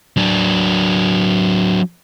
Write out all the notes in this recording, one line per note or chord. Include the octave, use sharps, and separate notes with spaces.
F#3 D4